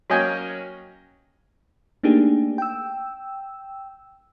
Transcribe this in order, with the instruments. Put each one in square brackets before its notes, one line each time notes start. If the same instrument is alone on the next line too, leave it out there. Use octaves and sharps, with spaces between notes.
[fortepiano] F#3 A#3 C#4 D#5 G5 G#5
[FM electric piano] A3 A#3 D4 D#4 G4 G#4
G5 E6